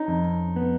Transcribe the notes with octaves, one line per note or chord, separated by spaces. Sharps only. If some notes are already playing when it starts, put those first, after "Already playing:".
Already playing: C#4 D#4
F2
B3